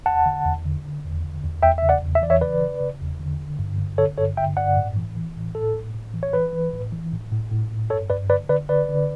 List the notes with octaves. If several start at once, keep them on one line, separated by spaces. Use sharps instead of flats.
E2 F#5 A5
D3
E2
D3
D3
E2
D3
E2
E2 E5 G5
C#3 E5
D5 F#5
E2
E5
E3 D5
C#5 E5
C#3 B4 D5
C#3
C#3
E2
D3
D3
G2
D3
D3 A4 C#5
G2 A4 C#5
D3 E5 G5
G2 D5 F#5
A2
E3
E3
A2
A2 A4
A2
A2
E3
C#5
E3 B4
E3
A2
E3
A2
A2
A2
A2
G2 A4 C#5
G2 B4 D5
D3 B4 D5
D3 B4 D5
D3 B4 D5
D3